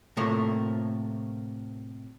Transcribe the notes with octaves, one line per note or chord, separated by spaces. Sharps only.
A2 C3 F3 A3 A#3